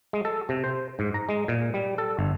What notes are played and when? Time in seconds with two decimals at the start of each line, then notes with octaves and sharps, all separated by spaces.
0.13 G#3
0.25 A4
0.49 C3
0.64 C5
0.99 G#2
1.14 A#5
1.29 G#3
1.48 A#2
1.74 G3
1.98 A4
2.19 G1